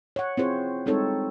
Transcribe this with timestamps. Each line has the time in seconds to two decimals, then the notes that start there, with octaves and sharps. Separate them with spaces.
0.16 C#5 F#5
0.37 C4 E4 F4 G#4 C5 C#5
0.86 G3 G#3 C4 D#4 A4 C#5